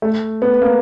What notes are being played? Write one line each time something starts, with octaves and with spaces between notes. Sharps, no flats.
A3
B3
A#3